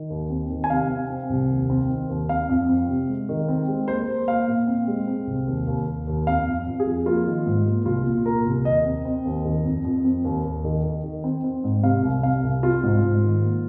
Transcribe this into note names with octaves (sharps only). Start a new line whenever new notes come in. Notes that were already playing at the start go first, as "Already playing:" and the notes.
Already playing: D#3
D#2
C4
D#3
G#5
C3 F5
C4
C4
C2
D#2
C4
D#3
D#2
C4 F5
F2
C4
C3
G#3
D#3
C4
G#3
A#3 C5
A#3
A#3 F5
A#2
C4
G#3
C4
C2
D#2
D#2
D#2
D#2
F2 F5
F2
F2
G#4
F3
A#3 F4
D#3
G#2
A#3
C2 F4
A#2
A#2 A#4
C2
D#2 D#5
C4
C4
D#2
D#3
F2
F2
C4
D#2
D#2
D#3
D#3
D#3
C4
C4
G#2
C3 F5
C2
C3 F5
C2
C4 F4
G#2
G#2
D#3
A#3